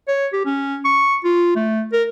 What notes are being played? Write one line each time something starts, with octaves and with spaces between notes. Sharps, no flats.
C#5
G4
C#4
C#6
F4
A3
A#4